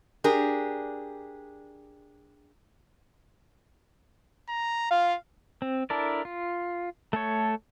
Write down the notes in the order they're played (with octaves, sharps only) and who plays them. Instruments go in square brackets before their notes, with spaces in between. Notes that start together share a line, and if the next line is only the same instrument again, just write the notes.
[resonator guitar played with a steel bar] D4 G4 G#4 A#4
[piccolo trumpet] A#5
[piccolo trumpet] F4 [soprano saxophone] F5
[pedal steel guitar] C4
D4 E4 A4 A#4 D5
F4
A3 A4 C#5